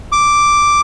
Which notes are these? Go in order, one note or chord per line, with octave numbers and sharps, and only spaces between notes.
D6